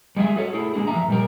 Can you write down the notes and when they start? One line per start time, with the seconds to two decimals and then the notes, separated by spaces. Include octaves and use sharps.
0.16 G3 G#3 G#4 E5
0.36 F#4 A4 C#5
0.53 A3 E4 G#4
0.74 G#3 A#3 D4 G#4
0.87 E3 F3 E5 A#5
1.08 A#2 G3 A#4